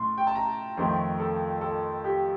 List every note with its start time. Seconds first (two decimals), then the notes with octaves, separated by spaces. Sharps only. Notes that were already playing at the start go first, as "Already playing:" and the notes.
Already playing: A2 A3 C6
0.18 G5
0.27 A5
0.35 A#5
0.77 F2 D#3 A3 C5
1.20 A4
1.61 A4
2.04 G4